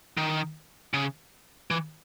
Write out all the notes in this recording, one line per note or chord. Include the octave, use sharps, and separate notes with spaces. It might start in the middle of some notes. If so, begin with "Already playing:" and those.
D#3
C#3
E3